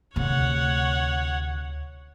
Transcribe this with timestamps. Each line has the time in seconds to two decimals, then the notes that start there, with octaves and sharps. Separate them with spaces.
0.16 D2 C3 C#5 F#5